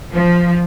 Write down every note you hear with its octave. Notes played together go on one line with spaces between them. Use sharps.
F3